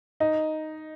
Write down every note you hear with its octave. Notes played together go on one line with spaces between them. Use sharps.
D#4